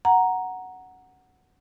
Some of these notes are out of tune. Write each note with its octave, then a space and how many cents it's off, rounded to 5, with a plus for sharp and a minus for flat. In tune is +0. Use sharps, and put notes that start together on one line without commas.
F#5 +0 A#5 +0